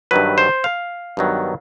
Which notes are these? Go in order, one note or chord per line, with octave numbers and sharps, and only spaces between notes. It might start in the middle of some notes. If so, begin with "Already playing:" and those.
G2 D#3 F#3 B4
C5
F5
G2 D#3 F#3 B3